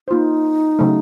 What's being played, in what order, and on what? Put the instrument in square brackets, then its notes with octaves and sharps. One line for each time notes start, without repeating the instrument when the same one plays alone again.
[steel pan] A#3 F4 C5 [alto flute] D#4
[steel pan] C#3 F#3 A3